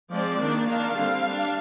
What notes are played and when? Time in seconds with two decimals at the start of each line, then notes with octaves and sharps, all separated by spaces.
0.12 F3 G#3 C4 D5
0.40 D#3 A#3 D4
0.68 D#3 A#3 D4 F5
0.96 D3 G3 C4 F5
1.24 G3 D4